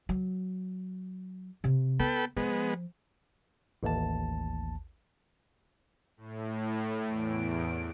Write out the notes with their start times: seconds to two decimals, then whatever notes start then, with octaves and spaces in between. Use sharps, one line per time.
0.09 F#3
1.64 C3
1.99 B3 A4 B4 G5
2.37 F3 G#3 B3
3.83 A1 D#2 A5
6.17 A2
7.06 E2 D7